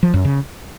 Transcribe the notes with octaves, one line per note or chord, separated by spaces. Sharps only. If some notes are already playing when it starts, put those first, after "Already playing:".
F3
F#2
C#3